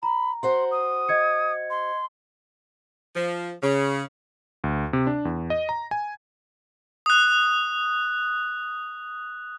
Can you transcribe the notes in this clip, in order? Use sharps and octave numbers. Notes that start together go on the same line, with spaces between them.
A#5 B5
F#4 C5 F#5 C6
D#6
D#5 G#6 C#7
C6
F3
C#3
D2
C3
D4
E2
D#5
A#5
G#5
D#6 F#6